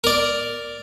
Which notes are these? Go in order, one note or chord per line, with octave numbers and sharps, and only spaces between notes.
A#4 D5